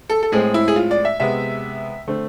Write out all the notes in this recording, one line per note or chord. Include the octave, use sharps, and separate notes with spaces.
A4
A4
A2 G#3 C4 G#4
E4
G#4
F4
D5
E5
C3 G#3 B3 E5
D3 A3 C4